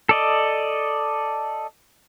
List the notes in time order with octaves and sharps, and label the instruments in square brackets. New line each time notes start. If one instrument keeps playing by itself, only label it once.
[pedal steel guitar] A4 D5 D#5